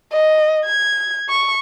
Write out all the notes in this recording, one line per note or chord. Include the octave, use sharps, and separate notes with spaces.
D#5
G#6
C#6